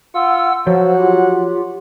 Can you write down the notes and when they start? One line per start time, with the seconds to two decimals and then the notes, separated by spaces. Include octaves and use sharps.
0.15 F4 F#5 E6
0.67 F3 F#3 C5 F#5
0.99 F4 G4